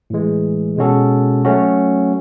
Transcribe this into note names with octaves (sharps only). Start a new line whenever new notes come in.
A2 E3 G#3
B2 G#3 C#4 F#4 A4
F#3 A3 C#4 F#4